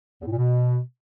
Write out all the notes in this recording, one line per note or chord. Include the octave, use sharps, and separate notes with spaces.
E2
A2
A#2
B2